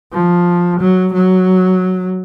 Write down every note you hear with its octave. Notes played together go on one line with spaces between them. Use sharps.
F3
F#3
F#3